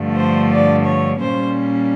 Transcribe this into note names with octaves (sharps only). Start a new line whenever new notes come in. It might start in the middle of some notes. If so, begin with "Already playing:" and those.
Already playing: G2 D3 F3 A3
C5
D5
C#5
A#2 G3 A#3 C#4 C5